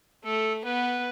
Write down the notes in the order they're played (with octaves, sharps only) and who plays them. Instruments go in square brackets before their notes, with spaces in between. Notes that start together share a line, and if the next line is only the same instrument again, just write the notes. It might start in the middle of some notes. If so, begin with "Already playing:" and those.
[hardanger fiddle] A3 [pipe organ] A4
[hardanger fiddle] B3 [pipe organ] B4